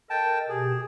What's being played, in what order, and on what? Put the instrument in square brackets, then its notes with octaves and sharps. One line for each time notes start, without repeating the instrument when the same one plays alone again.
[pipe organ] A4 A#4 D#5 [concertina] G5 A5
[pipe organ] B2 G4 [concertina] G#4